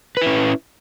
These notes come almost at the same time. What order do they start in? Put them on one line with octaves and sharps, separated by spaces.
B4 E4 C#4